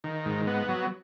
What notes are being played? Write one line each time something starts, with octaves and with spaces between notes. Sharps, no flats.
D#3
G#2
B3
F#3